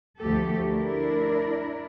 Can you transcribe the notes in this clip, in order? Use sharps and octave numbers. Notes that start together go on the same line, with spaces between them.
D2 F3 A3 G4 A4
D4 E4 A#4